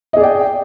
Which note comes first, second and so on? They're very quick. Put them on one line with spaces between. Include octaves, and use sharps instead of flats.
D#5 G#4 D5 G5